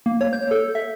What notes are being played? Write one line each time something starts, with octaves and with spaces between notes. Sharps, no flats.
A#3
C#5
G6
A4
E5